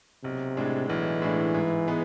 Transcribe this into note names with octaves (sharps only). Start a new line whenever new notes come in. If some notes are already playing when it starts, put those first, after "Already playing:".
B1 C3
A2 G#3 D4
B1 E3
A2 G#3 D4
G#2
G#3 B3